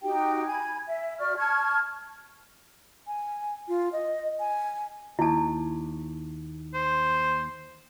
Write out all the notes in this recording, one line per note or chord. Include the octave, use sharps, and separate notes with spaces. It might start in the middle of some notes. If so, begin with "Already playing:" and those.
D#4 F#4 G4 G5
G#5 B5 G#6
E5
F#4 D5 C#6 F6
A5 C#6 F6 G#6
G#5
F4
D#5
G#5
D#2 E4 A5
C5